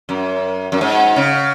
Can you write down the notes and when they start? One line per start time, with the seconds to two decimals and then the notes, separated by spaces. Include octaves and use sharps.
0.09 F#2
0.72 F#2
0.81 G#2
1.16 C#3